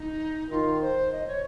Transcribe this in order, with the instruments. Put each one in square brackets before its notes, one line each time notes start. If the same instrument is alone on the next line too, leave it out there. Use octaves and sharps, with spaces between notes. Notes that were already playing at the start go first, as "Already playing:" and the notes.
Already playing: [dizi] D#4
[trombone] D#3 [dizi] F4
[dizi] C5
D#5
C#5